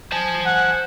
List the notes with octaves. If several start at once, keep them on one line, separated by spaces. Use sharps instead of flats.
C5 G#5 A5
F#5